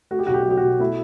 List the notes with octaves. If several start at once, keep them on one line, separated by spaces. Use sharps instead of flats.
A3 F#4
G4
B1 F#4
G4
F#4
F#3 G4
F#4
B2
A3 E4